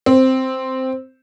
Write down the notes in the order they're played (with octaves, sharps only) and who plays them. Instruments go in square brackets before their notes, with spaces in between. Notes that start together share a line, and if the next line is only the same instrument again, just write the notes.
[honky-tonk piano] C4